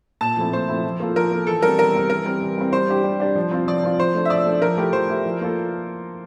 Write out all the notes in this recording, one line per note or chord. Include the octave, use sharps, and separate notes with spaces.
A#2 A5
F3 A3 C4 E4
A#2 C5
F3 A3 C4 E4
F3
A#3 F4 A4
F3 A#4
A#3 F4 A4
E3 A4
G3 C4 A#4
E3 A#4
G3 C4
E3 A#4
G3 C4
E3
G3 C4
G3 C5
D4 G4
G3
D4 G4
F3
C4 F4
F3 D5
C4 F4
F3 C5
A3 D4
E5
F3 D5
A3 D4
F3 A#4
A3 E4 G4
F3 C5
A3 E4 G4
F3
A#3 F4 A4